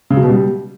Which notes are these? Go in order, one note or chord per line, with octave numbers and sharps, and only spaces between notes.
C#3
F#3
B2
G3